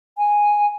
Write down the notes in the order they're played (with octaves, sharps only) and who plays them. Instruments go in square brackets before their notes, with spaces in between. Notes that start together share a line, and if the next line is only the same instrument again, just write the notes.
[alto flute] G#5